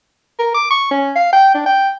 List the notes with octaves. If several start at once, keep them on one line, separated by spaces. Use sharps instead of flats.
A#4
D6
C#6
C#4
F5
G5
D4
G5